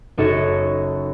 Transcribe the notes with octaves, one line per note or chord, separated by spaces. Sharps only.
F#1 D#4 F#4 A4 C#5